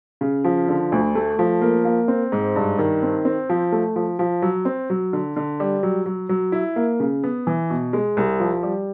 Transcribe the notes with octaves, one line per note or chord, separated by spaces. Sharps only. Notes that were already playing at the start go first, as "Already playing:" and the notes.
C#3
F3
D3
D2
A3
F3
A#3
A#3
C4
G#2
G2
D#3
C4
C4
F3
A3
F3
F3
F#3
C4
F#3
D3
D3
G3
F#3
F#3
F#3
E4
A#3
C#3
B3
E3
B2
G#3
C2
F3
G3